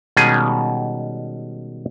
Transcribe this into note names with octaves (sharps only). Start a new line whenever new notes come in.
B2 D#3 G3 G#3 C#4 G#4